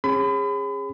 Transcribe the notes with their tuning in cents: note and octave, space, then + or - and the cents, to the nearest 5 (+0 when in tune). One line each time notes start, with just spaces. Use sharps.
C#4 -30 G#4 -30 B5 +35